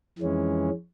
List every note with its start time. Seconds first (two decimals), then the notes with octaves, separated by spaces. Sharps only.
0.19 F2 E3 G#3 C#4